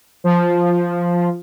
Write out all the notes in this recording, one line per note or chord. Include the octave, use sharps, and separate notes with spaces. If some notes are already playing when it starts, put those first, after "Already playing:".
F3